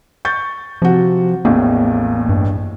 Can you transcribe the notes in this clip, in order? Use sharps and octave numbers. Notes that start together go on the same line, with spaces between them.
C#6 G6 A6
C3 F3 F#4
A1 E2 A2 A#3
G2